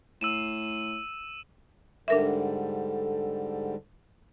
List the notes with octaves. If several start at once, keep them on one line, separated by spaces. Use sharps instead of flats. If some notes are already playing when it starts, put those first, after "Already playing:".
A2 E6 D#7 E7
G#2 D3 G3 D4 A4 A#4 E5